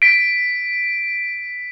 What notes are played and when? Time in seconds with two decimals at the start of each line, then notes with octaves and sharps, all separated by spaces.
0.02 B6 D7